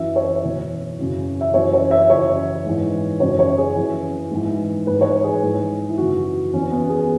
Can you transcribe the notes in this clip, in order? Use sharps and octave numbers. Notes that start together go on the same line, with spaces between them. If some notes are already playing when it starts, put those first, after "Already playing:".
Already playing: F#2 E3 E5
C#5
E2 B2
F#2 C#3 E3
E5
F#2 E3 C#5
C#5
E5
F#2 C#3 E3 C#5
G#2 E3
F#2 C#3 E3 C#5
C#5
G#4
F#2 E3
G#2 E3
G#2 E3 B4
C#5
B4
G#4
G#2 E3
E4
F#2 C#3 E3 F#4
E2 E3 C#4
B3
G#4